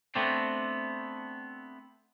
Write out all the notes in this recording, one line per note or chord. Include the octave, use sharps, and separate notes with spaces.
A3 B3 C4 D4